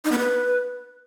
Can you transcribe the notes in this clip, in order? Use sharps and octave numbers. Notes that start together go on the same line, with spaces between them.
D#4
B3
B4